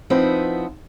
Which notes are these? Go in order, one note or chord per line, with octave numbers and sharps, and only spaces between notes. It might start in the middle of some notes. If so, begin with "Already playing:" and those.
F3 B3 C4 D#4 E4